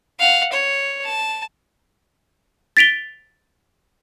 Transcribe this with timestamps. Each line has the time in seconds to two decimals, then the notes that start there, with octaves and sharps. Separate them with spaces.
0.20 F5 F#5
0.52 C#5
1.04 A5
2.77 A6 B6 D7 F7 G7